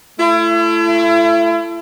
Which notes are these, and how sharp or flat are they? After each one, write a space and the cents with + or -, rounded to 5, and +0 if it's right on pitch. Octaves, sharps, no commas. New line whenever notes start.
A3 +0 E4 +40